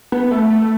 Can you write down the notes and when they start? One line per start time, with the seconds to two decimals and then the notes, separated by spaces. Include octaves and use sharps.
0.12 B3
0.31 A3
0.50 A3